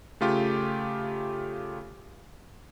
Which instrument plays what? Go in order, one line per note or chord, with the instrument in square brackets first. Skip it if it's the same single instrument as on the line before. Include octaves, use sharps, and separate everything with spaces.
[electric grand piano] C#3 A3 F4 G4